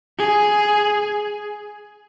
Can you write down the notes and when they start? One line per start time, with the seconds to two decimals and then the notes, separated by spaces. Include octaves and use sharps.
0.18 G#4